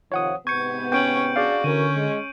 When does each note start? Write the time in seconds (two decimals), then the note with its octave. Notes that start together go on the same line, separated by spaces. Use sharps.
0.12 C3 D#3 F3 C#5 F#5 D#6
0.47 G#2 C3 B3 C#6 G6 G#6 C#7
0.92 C#4 G5 G6 D7 F#7
1.36 D4 F#4 G#4 D5 F5
1.64 D3 E3 C#4 F#4 A#4 D#7
1.96 G#3